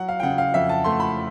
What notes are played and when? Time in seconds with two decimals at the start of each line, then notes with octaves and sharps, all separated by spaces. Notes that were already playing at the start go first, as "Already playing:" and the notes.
Already playing: F#3 F#5
0.08 F5
0.20 G5
0.23 C#3 F#5
0.38 F5
0.54 F2 E5
0.69 A5
0.84 A3 C6
1.00 B5